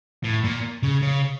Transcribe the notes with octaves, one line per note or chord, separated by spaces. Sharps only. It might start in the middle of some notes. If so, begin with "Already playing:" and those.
A2
A#2
C#3
C#3